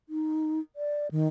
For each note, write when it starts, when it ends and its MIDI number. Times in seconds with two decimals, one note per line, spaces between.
0.09 0.60 63
0.76 1.11 74
1.11 1.28 51